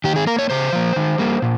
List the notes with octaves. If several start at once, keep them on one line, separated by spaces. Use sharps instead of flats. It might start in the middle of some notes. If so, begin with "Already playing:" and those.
D#3 G4
G#4
A#3 A#4
C#5
C#3 C5
F3 A#3
D#3
G3 A#3
A#2